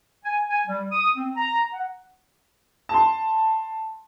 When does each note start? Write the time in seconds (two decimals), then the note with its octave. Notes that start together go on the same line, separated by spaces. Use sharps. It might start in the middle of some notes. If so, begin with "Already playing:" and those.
0.24 G#5
0.49 G#5
0.67 G3
0.92 D#6
1.16 C4
1.37 A#5
1.73 F#5
2.89 A5 C6